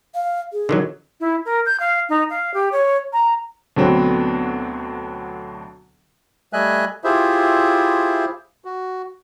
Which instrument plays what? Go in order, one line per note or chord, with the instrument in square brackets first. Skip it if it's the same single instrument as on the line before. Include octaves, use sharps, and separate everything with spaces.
[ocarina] F5
G#4
[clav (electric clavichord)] D3 D#3 F#3
[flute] E4
A#4
G6
F5
D#4
F5
G4
C#5
A#5
[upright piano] D2 B2 D3 F#3 B3 C4
[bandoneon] G3 A3 D#5 E5 G#5 F#6
E4 F4 G4 G#4 C5 E5
F#4